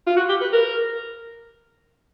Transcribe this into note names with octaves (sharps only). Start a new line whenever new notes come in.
F4
F#4
G4
B4
A#4